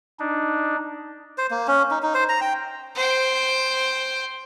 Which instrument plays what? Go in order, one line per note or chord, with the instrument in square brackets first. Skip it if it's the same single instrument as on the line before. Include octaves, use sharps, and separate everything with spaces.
[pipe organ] D4 D#4
[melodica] C5
A#3
C#4
D#4
D#4
C5
A#5
G5
[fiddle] C5 G5